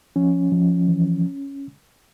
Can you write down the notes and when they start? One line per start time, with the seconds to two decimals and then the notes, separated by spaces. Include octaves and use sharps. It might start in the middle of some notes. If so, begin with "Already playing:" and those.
0.16 F3 C#4
0.52 F3
0.88 E3